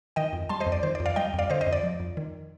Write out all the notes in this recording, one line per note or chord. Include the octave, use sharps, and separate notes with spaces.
D#3 D#5 G5
F2
G3 A5 C6
C5 D#5
F2
D5
D#3 C5
D5
F2
D5 F5
G3 D#5 G5
F2
D5 F5
D3 C5 D#5
C5 D#5
F2
D5
F3
F2
D#3